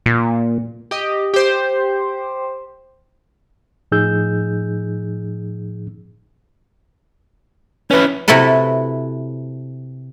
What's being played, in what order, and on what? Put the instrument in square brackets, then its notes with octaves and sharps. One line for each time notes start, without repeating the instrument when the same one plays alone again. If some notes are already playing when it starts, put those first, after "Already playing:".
[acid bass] A#2
[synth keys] G4 D#5
G4 C5
[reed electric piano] A2 F3 D#4 G#4 E6 G6
[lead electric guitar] C#4 E4 [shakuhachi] B4
[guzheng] C3 E4 F#4 A4 B4